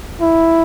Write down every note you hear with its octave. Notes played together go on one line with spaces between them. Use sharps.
E4